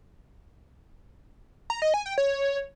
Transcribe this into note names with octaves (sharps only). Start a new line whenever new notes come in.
A#5
D#5
G#5
G5
C#5